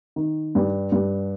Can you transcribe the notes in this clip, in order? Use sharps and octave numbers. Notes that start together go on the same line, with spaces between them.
D#3
G2
G2